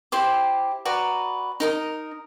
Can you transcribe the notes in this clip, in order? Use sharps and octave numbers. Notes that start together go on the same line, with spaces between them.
E4 G4 C5 D6
F#4 B4 D5 A#5
D#4 A#4 D#5